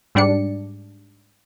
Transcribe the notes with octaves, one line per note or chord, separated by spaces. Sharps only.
G#2 G3 D4 D5 C#7